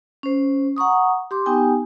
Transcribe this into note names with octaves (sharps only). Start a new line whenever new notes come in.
C#4 C5
F#5 A#5 C#6 D#6
G4 C6 D6
B3 D#4 G4 G5 G#5